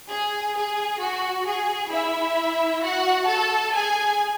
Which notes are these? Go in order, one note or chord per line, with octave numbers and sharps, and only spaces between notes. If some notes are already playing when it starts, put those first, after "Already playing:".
G#4
G#4
F#4
G#4
E4 E5
F#4 F#5
A4 A5
G#4 G#5